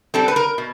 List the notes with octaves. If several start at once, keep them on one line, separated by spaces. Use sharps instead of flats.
G3 C4 A4
B4
A#4
B2